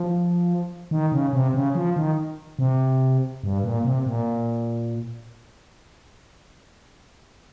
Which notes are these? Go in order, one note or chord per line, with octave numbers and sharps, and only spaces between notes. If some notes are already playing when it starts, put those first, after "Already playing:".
Already playing: F3
D#3
C#3
C3
C#3
F3
D#3
C3
G2
A#2
C3
A#2